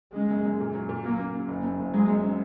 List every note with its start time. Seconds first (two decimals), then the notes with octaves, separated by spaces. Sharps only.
0.15 C#3 G#3
0.31 F#2
0.45 F#2
0.60 A#2
0.75 F#3
0.89 A#2
1.04 F#3 A#3
1.19 C#3
1.34 C#3
1.48 F#1
1.64 F#2
1.79 F#1
1.94 F#3 G#3
2.08 F#2
2.23 C#4